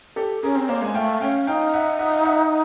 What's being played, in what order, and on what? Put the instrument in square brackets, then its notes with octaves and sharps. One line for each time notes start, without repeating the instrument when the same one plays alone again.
[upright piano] G4 A4
[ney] C#4 [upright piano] G#4 A#4
[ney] C4
[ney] A#3 [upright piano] C5 D5
[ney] G#3 [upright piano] G#5
[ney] A3 [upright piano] F5 G5
[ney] C#4 [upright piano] F5 G5
[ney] D#4 [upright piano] F5 G5
[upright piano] E5 F#5
E5 F#5
F5
E5 F#5